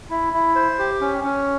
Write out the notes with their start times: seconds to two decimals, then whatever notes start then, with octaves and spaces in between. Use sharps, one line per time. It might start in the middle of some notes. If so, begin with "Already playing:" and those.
0.10 E4
0.33 E4
0.55 C5
0.79 G4
1.01 C#4
1.24 C#4